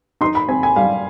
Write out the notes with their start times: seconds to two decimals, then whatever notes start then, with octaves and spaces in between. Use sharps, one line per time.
0.21 D#4 C6
0.35 B5
0.48 C4 G#5
0.63 G#5
0.76 G3 F5